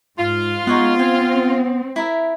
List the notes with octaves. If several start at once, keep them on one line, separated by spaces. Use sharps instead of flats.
G#2 F4
G#3 B3 D#4 C#5 F#5
C4 G5 G#5
E4 A#4 E5